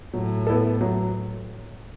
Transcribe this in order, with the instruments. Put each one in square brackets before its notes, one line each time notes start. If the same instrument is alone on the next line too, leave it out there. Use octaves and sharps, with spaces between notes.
[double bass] A2 [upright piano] F#3
[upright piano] B3 E4 A4
F#3